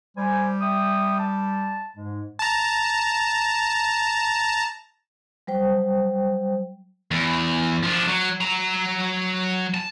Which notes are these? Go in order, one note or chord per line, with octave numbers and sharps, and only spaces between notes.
G3 C5 G#5
E5 G5 D#6
A5
G#2 G#3
A5 A#5
F#3 G3 C5 G5
E2
F3 D4
F#3
F#3 A#5
A5